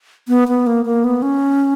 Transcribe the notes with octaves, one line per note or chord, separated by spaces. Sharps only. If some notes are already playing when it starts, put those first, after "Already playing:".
B3
B3
A#3
A#3
B3
C#4